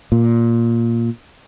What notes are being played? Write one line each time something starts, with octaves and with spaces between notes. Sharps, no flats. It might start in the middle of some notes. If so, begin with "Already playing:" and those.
A#2